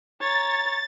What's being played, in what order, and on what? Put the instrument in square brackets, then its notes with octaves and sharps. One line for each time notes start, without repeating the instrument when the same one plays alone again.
[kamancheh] C#5 A#5 [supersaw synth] A6